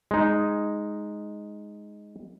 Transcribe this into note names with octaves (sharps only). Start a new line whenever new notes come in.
G#3 D#4